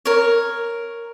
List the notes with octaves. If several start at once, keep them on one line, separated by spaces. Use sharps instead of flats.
A#4 C#5